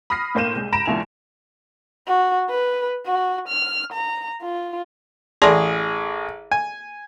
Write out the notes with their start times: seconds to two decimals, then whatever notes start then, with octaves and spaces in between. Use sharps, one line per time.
0.10 B5 D#6 F6 A#6 C7
0.35 A2 A#3 C5 G6 D#7 E7
0.56 C2 G#3
0.72 C#2 A#5 B5 A#6 D7 E7
0.86 F1 D2 F3 E4 G#5 F7
2.07 F#4
2.50 B4
3.06 F#4
3.49 F6
3.93 A#5
4.42 F4
5.42 A1 G#4 D5 A5 C6
6.52 G#5